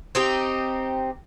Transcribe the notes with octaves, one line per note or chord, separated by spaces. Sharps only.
C4 D#4 G4